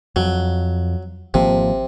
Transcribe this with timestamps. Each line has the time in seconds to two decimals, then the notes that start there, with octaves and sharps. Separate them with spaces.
0.16 F2 F#3
1.34 G#1 C3 F3 A#3